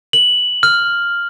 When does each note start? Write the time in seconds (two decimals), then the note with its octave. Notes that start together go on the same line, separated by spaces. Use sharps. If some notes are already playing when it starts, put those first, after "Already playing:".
0.13 F#7
0.63 F6